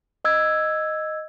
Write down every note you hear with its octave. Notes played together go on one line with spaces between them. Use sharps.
D#5 E6 G#6